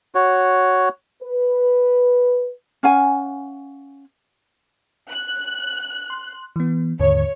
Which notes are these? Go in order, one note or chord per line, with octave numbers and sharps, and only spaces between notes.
F#4 C#5
B4
C#4 F5 F#5 G#5
F#6
C6
E3 B3
D#2 G#2 D3 C#5